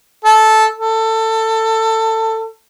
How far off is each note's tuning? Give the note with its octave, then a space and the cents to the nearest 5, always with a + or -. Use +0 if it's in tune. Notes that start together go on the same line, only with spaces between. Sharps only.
A4 -10
A4 +20